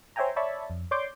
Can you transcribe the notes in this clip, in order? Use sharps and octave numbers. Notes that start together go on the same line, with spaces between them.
C5 C#5 E5 G5 G#5 A#5
C#5 D5 E5 A5 B5 C#6
F2
C#5 D5 C6 D6 G6